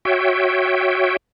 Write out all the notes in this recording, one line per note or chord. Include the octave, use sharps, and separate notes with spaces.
F#4 C#5 E5 G5